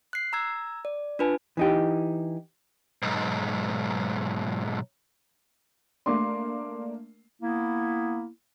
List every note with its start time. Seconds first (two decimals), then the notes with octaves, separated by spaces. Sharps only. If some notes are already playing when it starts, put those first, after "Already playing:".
0.13 F#6 C7
0.33 A#5 E6 G#6
0.85 D5
1.19 D4 F4 B4 G#5 A5
1.57 E3 D#4 G4
3.02 B1 G#2
6.06 A3 A#3 D4 C6 D6
7.42 A#3 B3 E4